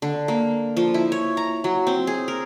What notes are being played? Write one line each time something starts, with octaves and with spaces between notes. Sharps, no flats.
D3
A#3
F3
E4
C#5
A#5
F#3
C4
G#4
A#4